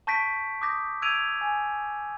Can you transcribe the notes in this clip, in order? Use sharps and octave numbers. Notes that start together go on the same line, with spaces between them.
A5 C#6 G6 A#6 B6 D7
D6 D#6 G6 A#6
E6 G6 G#6 D7 D#7 F7
G#5